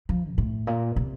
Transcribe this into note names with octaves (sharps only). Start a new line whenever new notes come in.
F3
A#2
A2
A#2
C3